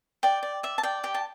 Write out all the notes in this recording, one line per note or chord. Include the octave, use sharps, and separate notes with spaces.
D5 G5
D5
D5 E5
A5
D5 G5
G4 G5
A5